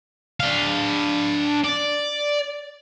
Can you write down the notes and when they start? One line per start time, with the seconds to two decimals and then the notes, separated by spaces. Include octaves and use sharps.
0.40 D4 F5
1.64 D5